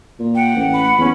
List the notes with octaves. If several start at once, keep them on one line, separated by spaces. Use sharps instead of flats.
A#2
F#5 G5
A1
B5
E2 C#4